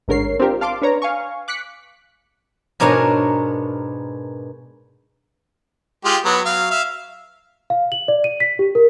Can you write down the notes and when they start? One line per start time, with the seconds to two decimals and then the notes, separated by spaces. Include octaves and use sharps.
0.08 A1 G#2 D3 A#4 C#5 C7
0.39 C4 D4 F4 G4 A#4
0.61 F5 A5 C6 D6
0.82 D4 B4 C#5 A#5
1.02 F5 G#5 C#6
1.48 D6 F#6 B6 C#7
2.80 G#2 B2 D4 A#4 C#5 G#5
6.05 G#3 F4 G4
6.25 F#3 B3
6.45 F#3 F5
6.71 E5 F5
7.70 F5
7.92 F#7
8.08 D5
8.24 D#7
8.40 B6
8.59 G4
8.75 A#4